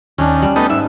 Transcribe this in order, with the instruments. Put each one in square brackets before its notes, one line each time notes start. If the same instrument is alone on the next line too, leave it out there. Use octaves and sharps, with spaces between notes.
[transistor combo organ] D#2 [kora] C#4 D4
[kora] G3
[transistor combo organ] A3 B3 D#4
[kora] G#2 [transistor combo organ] E5